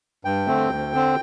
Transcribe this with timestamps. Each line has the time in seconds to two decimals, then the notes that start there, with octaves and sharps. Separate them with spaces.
0.25 G2 G5
0.47 D3 A3 C4
0.70 D2
0.93 D3 C4